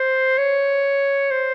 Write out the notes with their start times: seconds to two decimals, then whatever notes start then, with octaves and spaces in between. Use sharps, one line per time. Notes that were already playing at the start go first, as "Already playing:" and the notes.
Already playing: C5
0.38 C#5
1.31 C5